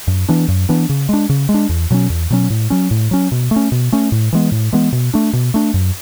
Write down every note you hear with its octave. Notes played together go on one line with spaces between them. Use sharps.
F#2
E3 B3 D4
F#2
E3 B3 D4
C#3
G#3 D4
C#3
G#3
D4
E2
B2 F#3 C#4
E2
B2 F#3 C#4
A2
F#3 C#4
A2
F#3 C#4
B2
A3
C#4
B2
A3 C#4
A2
E3 G#3 B3
A2
E3 G#3 B3
B2
A3 D4
B2
A3 D4
F#2